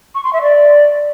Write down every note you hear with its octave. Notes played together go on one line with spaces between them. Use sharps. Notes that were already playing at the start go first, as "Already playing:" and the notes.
C#6
C6
E5
D5